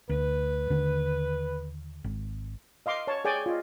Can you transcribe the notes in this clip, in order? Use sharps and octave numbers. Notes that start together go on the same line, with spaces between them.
D2 B4
D#2 D3 D#3
G#1
D#5 F5 C6 D6
C#5 A5
G#4 C#5 D5 G5 G#5
F4 D#5